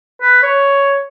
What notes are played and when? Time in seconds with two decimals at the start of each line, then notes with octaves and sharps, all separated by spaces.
0.22 B4
0.43 C#5